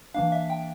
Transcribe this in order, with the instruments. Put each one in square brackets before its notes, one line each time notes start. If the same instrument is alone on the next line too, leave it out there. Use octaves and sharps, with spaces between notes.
[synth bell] E3 A#3 D4 F5
E5
G5